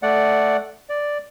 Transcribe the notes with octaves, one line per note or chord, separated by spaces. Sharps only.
A3 D5 F#5
D5